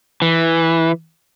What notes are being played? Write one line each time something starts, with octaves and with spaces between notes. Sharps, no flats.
E3